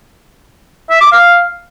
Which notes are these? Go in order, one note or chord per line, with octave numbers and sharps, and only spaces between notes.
E5
D6
F5